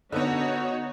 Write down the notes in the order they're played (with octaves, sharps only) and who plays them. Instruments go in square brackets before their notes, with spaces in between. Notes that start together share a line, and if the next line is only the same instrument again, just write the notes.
[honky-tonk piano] D3 B3 [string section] D#4 F#4 C#5